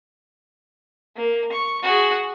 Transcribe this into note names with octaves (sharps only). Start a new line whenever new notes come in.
A#3
C#6
F#4 G#4